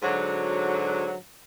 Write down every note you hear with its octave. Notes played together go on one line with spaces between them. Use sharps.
G#2 D3 F#3